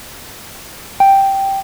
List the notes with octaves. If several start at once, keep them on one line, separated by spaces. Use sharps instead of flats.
G5